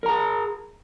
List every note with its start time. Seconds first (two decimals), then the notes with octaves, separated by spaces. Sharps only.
0.03 A#4
0.06 A#5
0.09 G#4